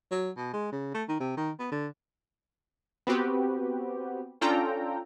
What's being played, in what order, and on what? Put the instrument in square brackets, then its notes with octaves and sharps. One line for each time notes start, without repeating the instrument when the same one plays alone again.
[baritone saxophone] F#3
B2
G#3
C#3
A3
D#3
C3
D#3
B3
D3
[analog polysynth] B3 C4 F#4 G4 B4
C#4 D4 F4 A4 G5 A#5